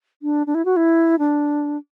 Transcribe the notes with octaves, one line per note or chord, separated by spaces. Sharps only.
D4
D4
E4
F#4
E4
D4